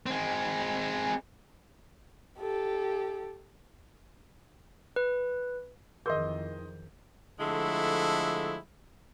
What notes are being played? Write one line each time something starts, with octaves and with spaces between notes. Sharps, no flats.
G#3 C4
G4 A4
B4
F2 D#3 E3 G#4 A#4 D#5 C6 G6
D3 F3 G#3 A3 E4